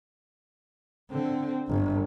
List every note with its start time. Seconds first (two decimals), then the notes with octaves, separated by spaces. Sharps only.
1.11 D3 C4
1.68 G1